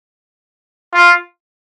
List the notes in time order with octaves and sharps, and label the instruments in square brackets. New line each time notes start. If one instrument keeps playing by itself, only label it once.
[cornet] F4